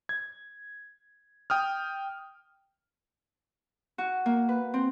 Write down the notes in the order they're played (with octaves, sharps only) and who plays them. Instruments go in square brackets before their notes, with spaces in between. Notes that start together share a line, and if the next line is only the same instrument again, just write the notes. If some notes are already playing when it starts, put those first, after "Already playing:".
[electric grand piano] G#6
G5 D#6 F6
[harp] F#4
A#3
B4
C4